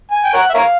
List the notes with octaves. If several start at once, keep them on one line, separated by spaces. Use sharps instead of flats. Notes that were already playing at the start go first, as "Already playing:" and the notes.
G#5
G5
A#4 C#5 F#5
E5
A#4 C#5 F5